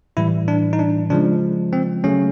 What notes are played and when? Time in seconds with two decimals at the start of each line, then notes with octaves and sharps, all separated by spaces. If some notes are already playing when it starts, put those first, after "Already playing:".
0.17 A2 E3 G3 E4
0.48 D4
0.73 D#4
0.79 D4
1.10 C#3 F3 G#3 D4
1.73 C4
2.04 C#3 F#3 A3 C#4